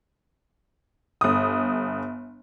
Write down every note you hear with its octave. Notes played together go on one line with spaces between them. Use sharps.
G1 D#6